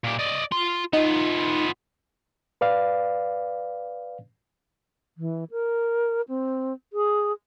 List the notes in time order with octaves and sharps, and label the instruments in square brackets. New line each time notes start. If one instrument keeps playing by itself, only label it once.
[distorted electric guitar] A#2 G4
D5 D#5
F4 C6
[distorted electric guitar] B3 F4 [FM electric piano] D#4
[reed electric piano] B4 D5 F5
[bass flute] E3
A#4
C4
G#4